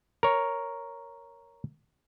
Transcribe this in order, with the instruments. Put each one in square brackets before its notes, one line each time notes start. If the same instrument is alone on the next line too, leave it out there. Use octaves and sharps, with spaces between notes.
[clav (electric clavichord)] A#4 C#5